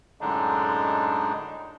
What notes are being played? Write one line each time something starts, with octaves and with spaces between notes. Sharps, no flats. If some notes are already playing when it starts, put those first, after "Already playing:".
F#2 A2 D3 G#3 D4 D#4